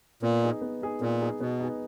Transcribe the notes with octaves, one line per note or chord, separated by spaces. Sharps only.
A#2 B3
D#4 G#4
B3
D#4 G#4
A#2 B3
D#4 G#4
B2 B3
D#4 G#4